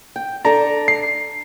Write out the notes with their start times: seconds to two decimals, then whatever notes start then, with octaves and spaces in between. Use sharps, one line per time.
0.16 G5
0.45 D4 A4 A5 A#5
0.88 C7